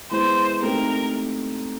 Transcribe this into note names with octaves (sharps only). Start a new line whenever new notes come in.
E3 G#3 B3 C5
A3 C4 D#4 G4 A#4